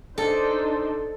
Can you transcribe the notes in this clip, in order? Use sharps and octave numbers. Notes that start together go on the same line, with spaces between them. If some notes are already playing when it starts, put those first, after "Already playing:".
D4 D#4 A4 C5